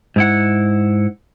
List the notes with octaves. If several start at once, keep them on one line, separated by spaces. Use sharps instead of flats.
G#2 E4 F#5